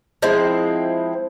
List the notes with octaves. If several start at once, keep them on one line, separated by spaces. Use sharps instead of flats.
F3 G#3 C4 E4